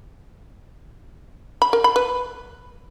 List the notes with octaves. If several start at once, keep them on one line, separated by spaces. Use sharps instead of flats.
B5
A#4
B5
B4